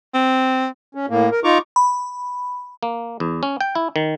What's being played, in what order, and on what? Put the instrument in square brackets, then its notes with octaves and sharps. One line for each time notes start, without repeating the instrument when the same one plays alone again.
[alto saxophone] C4
[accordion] C#4
A2 A#3
A#4
D#4 F4 A#5 C#6 D6
[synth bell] B5
[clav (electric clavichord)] A#3
E2
C#4
G5
E4
D#3